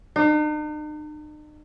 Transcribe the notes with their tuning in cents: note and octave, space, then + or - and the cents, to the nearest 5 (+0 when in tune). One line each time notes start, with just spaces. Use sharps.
D#4 -45